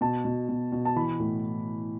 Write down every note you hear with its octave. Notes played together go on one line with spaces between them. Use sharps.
B2 A5
B2
B2
B2
A5
E3 B5
A2